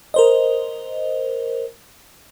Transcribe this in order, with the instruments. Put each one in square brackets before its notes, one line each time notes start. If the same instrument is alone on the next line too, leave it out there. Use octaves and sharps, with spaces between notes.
[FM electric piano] A#4 C5 D#5